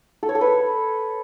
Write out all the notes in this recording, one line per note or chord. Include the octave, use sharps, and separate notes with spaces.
A4
C#5
A4
B4